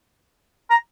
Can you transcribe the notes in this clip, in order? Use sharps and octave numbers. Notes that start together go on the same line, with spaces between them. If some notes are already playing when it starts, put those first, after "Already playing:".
A#5